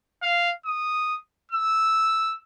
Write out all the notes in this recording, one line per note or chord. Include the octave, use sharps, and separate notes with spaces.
F5
D#6
E6